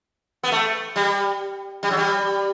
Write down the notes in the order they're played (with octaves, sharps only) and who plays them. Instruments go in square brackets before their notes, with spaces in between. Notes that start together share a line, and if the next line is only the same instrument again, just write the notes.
[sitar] B3
A3
G3
G3
F#3
G3